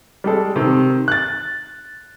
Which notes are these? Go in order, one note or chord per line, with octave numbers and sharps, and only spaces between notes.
G3 G#3 A4
C3 D#3
F#6 A6